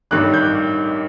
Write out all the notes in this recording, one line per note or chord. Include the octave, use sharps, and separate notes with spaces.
A1 G2 D#3 G3 F#6
G6